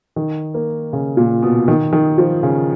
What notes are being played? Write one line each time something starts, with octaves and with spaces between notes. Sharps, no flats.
D#3
A#3
C#3
A#2
B2
D#3
D#3
F3
C#3